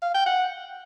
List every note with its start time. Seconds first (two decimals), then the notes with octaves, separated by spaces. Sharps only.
0.02 F5
0.14 G5
0.26 F#5